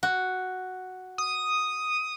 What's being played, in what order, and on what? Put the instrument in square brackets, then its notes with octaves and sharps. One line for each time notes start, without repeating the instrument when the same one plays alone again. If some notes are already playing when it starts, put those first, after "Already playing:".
[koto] F#4
[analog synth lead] D#6